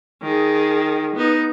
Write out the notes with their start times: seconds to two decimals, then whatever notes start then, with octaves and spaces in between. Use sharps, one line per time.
0.22 D#3 G#4
1.16 B3 D#4